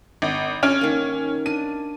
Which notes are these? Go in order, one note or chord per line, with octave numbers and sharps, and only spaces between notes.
G#1
C#4 A4 F6 D7
D#3 A#3
D4 D#7